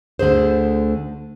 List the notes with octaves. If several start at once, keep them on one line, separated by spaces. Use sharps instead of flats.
D2 D3 A3 G#4 C5